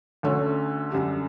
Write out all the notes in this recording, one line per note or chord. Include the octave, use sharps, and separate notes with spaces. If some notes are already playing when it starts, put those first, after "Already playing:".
D2 D3 A3 C#4
F#2 D3 G3